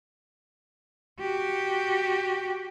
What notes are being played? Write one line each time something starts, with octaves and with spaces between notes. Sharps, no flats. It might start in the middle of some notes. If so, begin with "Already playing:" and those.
F#4 G4